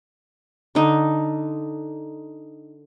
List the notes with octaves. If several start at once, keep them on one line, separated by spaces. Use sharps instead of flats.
D3 D#4